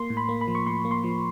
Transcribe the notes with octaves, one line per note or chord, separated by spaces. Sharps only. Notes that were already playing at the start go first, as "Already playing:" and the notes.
Already playing: A#3 C6
A2
B5
A#3
B5
F3
C#6
A2 C6
A#3
C6
F3